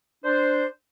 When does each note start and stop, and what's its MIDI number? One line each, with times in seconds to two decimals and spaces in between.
0.25 0.65 62
0.25 0.65 72